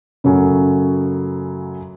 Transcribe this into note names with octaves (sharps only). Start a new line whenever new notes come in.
F#2 C#3 F#3 A3 C#4